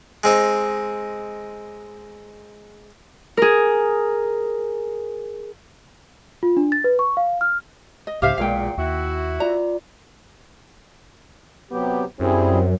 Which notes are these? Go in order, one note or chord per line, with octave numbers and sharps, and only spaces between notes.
G#3 C4 D#4
G#4 A#4
F4
D4
A6
B4
C#6
F5
F6
D#5
C2 G#2 C#3 G4 C5 E5 F5
B1 E2 A#2 G#3 F5 G5
D#2 E4 F#4
F4 D5 A#5
C3 F#3 B3 G4
F#2 G3 C4 E4 G#4